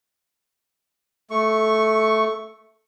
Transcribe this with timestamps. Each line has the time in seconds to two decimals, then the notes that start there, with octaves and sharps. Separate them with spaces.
1.31 A3 C#6